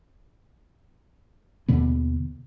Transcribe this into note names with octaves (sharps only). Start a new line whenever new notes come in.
D#2 B2 D3 B3